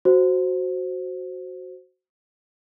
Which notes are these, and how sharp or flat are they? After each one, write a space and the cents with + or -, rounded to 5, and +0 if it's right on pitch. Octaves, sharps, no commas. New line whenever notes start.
F#4 +0 C5 +0